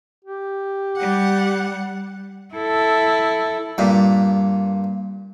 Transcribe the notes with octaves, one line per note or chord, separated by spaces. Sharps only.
G4
G3 F#5
E4 A4
G2 A#2